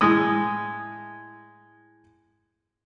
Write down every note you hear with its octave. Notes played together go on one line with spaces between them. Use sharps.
A2 G#3 D#6